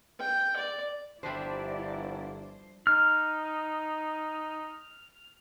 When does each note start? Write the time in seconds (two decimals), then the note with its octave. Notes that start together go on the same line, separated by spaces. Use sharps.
0.20 G5
0.57 D5
1.23 G1 F3 G3 D4 E4 C5 D5 E5
2.87 D#4 F6